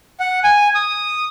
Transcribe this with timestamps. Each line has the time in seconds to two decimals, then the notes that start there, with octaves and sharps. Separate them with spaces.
0.20 F#5
0.44 G#5
0.75 D#6